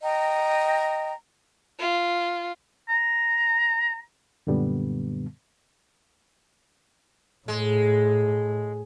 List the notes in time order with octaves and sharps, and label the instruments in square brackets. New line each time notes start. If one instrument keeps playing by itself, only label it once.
[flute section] D#5 G5 A#5
[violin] F4
[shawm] A#5
[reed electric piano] F#2 A#2 D3 G3 B3
[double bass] A2 [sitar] G#3